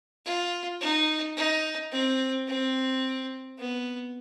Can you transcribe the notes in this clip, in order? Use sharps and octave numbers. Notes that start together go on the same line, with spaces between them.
F4
D#4
D#4
C4
C4
B3